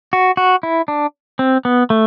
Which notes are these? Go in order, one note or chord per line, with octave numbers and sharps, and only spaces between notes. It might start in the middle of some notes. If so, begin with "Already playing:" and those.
F#4
F#4
E4
D4
C4
B3
A3